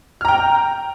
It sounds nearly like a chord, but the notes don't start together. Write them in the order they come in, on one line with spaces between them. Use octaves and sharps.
F6 A#5 G5